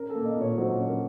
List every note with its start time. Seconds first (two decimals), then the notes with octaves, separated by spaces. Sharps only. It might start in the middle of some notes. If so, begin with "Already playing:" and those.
Already playing: C#4 A#4
0.10 A4
0.15 A#3
0.25 D#5
0.37 A#2 C#5
0.58 F#3 C5
0.79 C#4
0.89 A#4